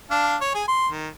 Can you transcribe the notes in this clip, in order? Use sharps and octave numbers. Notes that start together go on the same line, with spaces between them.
D4 F5 A5
C#5
G#4 G#5
C6
D#3